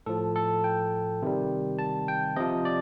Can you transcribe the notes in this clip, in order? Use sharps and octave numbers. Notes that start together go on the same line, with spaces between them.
A2 F3 A4
A4
G5
C3 D#3 G3
A5
G5
C3 F3 D#5
D5